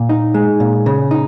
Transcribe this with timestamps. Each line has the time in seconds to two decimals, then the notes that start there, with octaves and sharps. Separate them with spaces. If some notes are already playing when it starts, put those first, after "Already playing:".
Already playing: A#2
0.09 D#4
0.34 G#3
0.60 A#2
0.86 C#3
1.11 D#4